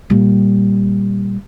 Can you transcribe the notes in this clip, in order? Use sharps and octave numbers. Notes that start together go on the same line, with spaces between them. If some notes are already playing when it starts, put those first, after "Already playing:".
A#2 G3